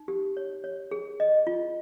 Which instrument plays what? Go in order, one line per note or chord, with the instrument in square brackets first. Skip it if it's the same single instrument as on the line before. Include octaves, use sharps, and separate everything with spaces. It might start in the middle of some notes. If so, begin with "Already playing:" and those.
Already playing: [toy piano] D#4
G4
C#5
C#5
G#4
D#5
F4